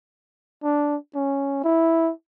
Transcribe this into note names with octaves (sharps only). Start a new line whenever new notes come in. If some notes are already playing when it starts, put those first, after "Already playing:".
D4
C#4
E4